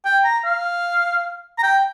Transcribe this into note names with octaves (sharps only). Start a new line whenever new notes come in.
G5
A#5
F5
A#5
G5